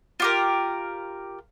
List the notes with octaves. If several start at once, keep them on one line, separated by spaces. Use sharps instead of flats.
F4 G4 A#4